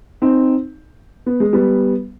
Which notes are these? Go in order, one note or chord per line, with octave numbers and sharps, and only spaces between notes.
C4 D#4
B3
G#3
G3 B3